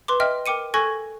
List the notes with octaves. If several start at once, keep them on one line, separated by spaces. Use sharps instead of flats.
B4 C6 D6
D#5 E5 G5 F6
A#4 G5 D6 C#7 D#7
A4 G#5 C#6 F#6 G#6 A#6